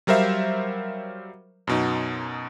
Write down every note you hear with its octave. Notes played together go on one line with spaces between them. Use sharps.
F#3 G3 A#4 C5 E5 F5
F#2 B2 D#4